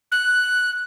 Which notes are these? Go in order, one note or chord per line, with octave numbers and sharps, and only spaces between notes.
F#6